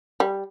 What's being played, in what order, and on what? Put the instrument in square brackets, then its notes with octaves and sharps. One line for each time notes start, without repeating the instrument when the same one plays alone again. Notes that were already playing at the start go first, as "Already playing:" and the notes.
[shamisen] G3